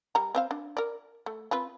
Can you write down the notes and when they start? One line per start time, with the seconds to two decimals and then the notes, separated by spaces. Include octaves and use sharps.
0.15 G3 A#5
0.35 C4 C5 F5
0.51 D4
0.77 A#4 D5
1.26 A3
1.51 C4 F4 B4